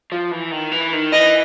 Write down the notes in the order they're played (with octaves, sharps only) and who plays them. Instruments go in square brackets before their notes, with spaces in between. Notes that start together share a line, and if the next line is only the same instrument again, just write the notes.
[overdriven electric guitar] F3
E3
D#3
E3
D#3
[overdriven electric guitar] E3 [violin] D#5